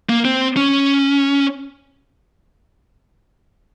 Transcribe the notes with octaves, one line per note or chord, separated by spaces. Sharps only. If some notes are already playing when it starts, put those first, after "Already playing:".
A#3
C4
C#4